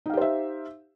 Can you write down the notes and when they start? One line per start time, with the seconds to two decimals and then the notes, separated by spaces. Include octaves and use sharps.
0.06 D#4
0.10 F5
0.14 G4
0.17 C5
0.21 E5